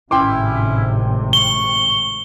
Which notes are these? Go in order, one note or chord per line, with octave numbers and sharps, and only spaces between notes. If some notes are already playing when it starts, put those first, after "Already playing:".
G#1 A2 C3 C#4 E4 G5 C6 D6
C#6 G7